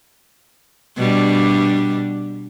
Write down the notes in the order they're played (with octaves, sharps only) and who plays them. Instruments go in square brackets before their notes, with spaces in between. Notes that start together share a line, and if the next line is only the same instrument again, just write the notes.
[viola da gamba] B2 G3 D4